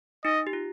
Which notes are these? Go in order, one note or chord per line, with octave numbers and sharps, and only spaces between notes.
D#4 D#5
G4
F4